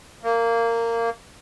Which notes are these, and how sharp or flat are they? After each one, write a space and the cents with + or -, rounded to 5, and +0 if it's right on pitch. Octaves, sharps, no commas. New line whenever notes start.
A#3 -15